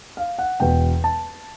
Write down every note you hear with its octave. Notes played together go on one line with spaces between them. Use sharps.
F5
F#5
E1 E2 B2 G5
A5